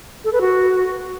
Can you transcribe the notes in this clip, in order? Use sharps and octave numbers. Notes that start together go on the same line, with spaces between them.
A4
B4
F#4